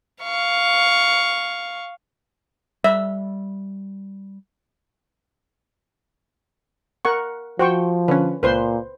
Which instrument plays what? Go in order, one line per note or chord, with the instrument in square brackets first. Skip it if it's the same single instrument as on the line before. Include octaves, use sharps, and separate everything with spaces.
[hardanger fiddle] F5 C#6
[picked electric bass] G3 [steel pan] E5
[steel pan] A#4 F#5 C#6
[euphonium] F3 [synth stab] F#4 [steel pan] C5 G5 C#6
[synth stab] D3 C#4 [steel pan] B4
[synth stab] C#2 [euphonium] A#2 [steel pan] B4 C5 C6